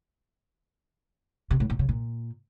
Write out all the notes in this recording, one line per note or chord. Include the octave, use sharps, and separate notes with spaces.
C3
A2
A#2
C#3
A#2